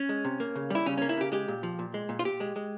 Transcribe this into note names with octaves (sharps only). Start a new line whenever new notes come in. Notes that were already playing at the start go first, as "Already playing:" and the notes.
Already playing: C#4
G#3
C3
A#3
C#3
G3 E4
C#3 C#4
A#3 C#4
E4
C#3 G4
G#3 G4
A#2
F3
A#2
G#3
A#2
F4
A#2 G4
G#3
G#3